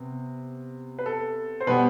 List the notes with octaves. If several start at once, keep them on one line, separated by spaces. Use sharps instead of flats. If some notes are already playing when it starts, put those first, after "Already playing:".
Already playing: C3 B3
B4
A4
C5
B2 G3 B3 B4